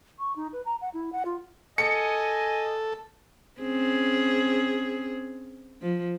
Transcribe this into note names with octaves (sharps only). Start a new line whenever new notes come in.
C#6
D#4
B4
A#5
F#5
E4
F#5
F4
A4 D#5 G#5 C#7
C4 C#4 G#4
F3